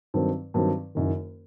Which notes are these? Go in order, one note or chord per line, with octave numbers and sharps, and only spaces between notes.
G2 D#3 F#3 C4
G2 D#3 F#3 C4
F#1 F#2 D#3